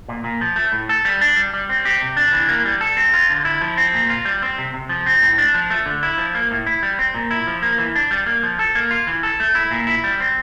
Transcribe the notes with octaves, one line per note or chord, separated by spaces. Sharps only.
A#2
A#2
F3
A3
A2
A4
G3
D4
G3
G3
C4
G4
C3
D4
E3
A#3
G3
A4
C4
F4
D3
E4
F3
C4
A#2
F4
G3
C4
C3
C3
F3
C4
A2
D4
F3
A3
D3
E4
F3
A#3
A2
E4
G3
C4
A#2
E4
F3
A#3
E3
D4
G3
A#3
F3
A4
A#3
F4
E3
A4
A3
E4
A#2
E4
G3
C4